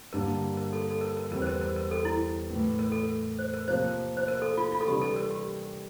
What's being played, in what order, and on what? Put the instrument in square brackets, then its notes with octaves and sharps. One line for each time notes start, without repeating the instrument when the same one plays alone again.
[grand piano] G2 D3 G3 A#3 [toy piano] A#4
[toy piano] A#4
A4
A4
A#4
A#4
[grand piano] E2 E3 G3 C4 [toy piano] A#4
[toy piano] C5
A#4
A#4
A#4
A4
E4
[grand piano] A2 E3 A3
[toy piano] A#4
A4
A#4
C5
A#4
[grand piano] C3 F3 A#3 [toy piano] C5
[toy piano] C5
A#4
A4
F4
F4
A4
[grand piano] C3 E3 G3 D4 [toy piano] G4
[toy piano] A4
A#4
G4